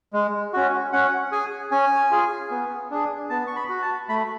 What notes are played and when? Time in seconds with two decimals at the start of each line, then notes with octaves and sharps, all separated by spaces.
0.13 G#3
0.53 C#4 F#4
0.93 C#4 F#5
1.32 G#4 G#5
1.71 C#4 G#5
2.11 F4 G#4
2.51 B3
2.91 D4 G#4
3.30 B3 A5
3.47 C#6
3.56 B5
3.69 F#4
3.82 A5
4.09 A3 B5